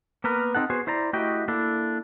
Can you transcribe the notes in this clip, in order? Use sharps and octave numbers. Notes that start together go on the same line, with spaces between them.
A#3 B3 A#4 B4
C4 D#4 A4 F#5
B3 F#4 G#4 C5
E4 C5 D5 A#5
A3 E4 F#4 G4 D#5 G5
A#3 D4 E4 A4